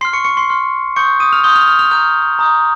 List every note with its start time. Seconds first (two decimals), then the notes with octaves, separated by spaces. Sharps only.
0.01 C6 F6 C7
0.13 C#6 C#7
0.24 C#6 C#7
0.37 C6 C7
0.49 C6 F6
0.96 C6 C#6 D#6 G6 C#7
1.20 D#6 D#7
1.33 F6 F7
1.44 C6 D#6 G6 G7
1.56 F6 F7
1.67 F6 F7
1.79 F6 F7
1.91 A#5 D#6 F6 G6 F7
2.39 A#5 D#6 G6